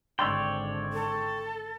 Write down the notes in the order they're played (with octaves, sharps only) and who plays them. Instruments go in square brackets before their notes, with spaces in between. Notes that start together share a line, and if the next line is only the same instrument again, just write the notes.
[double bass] G#1 D3 [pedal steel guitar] C#5 D5 G5 [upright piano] C6 E6
[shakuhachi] A4